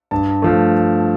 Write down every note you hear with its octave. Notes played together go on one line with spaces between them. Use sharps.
G2 A5
F3 A3